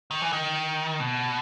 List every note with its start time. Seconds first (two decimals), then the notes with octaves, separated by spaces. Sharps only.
0.11 D#3
0.22 E3
0.33 D#3
1.00 B2